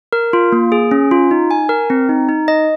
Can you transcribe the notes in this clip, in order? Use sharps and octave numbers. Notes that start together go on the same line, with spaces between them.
A#4
F4
A#3
G#4
C#4
F4
D#4
G#5
A#4
C4
D#4
D#4
D#5